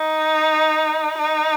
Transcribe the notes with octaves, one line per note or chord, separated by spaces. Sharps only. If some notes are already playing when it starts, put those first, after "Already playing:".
Already playing: D#4
D#4